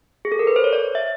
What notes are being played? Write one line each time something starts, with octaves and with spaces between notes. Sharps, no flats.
G#4
A4
A#4
B4
C5
C#5
D5
E5